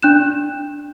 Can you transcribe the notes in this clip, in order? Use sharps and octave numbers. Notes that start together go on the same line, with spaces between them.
D4 F#6 E7